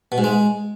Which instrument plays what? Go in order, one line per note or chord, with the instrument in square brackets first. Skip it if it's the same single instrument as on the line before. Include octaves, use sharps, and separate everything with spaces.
[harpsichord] B2
G#2
G#3